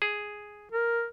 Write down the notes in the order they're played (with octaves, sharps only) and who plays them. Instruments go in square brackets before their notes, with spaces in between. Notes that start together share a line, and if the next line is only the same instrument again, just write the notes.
[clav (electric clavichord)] G#4
[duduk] A#4